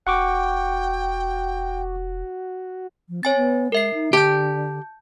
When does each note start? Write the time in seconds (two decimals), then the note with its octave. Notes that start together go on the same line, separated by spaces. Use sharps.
0.07 E1 F#4 F#5 G5 C#6 D6
3.09 F3
3.23 C4 C#5 G#5 A6
3.36 B3
3.72 G#3 A#4 E5 C7
3.94 D#4
4.13 D3 G4 A5 G6